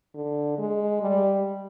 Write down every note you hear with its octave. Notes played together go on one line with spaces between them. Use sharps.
D3
G#3
G3